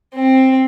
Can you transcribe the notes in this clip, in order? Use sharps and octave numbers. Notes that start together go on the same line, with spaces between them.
C4